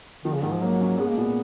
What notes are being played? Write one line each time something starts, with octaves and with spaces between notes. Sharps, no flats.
D#3 F3
C#3
G#2 D#3
F3
F#3 A#3
C#4
G#3 B3
A#3
A#2 B3